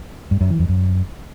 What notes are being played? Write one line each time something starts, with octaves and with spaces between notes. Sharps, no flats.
G2
F#2
E3
F2
F#2